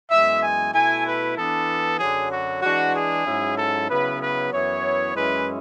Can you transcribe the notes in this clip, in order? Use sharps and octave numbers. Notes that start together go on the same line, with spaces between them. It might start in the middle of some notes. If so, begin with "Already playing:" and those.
F#2 E3 G#3 B3 E5
G#5
B2 A3 E4 G#5
B4
E3 B3 D4 A4
F#2 D3 F#3 G#4
F#4
E3 G#3 D4 F#4
G#4
G#2 F#3 C#4 E4
A4
C#3 F#3 B3 E4 B4
B4
F#2 E3 B3 E4 C#5
F#2 E3 G#3 C#4 E4 B4